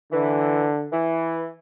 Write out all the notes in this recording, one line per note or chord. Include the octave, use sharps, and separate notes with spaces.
D3 E3
E3